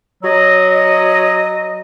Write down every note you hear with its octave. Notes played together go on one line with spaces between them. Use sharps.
F#3 D#5